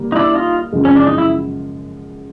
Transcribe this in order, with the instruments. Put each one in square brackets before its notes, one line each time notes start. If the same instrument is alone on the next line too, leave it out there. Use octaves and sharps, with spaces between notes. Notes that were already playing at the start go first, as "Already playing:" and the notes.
Already playing: [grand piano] D3 G3 A#3
[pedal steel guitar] D#4
D4 E4
D#4 F4
[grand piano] F#2 C#3 F3 G#3
[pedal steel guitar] C#4
D4
D#4
E4